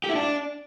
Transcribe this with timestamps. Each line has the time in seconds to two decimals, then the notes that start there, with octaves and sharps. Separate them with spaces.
0.04 G4
0.09 E4
0.15 D4